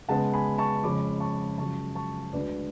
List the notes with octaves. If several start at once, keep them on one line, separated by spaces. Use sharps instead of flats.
C#3 G#3 B3 F#5 A5
G#5 B5
A5 C#6
F2 C#3 G#3 C#4 B5 D6
A5 C#6
F#2 C#3 F3 G#3 A5 C#6
A5 C#6
D2 D3 G#3 D4 B4 D5